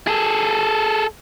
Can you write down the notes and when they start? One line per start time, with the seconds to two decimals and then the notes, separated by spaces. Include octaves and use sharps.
0.07 G#4 A4